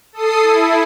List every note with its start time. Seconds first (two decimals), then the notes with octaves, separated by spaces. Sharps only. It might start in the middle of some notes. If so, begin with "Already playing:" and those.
0.13 A4 D#6 C7
0.42 E4